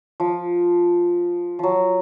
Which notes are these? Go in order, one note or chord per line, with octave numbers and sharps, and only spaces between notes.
F3
F3 F#3